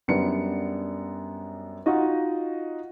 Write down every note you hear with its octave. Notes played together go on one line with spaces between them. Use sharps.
F#2 G3 B3 D4 C#7
D#4 F4 F#4 D#5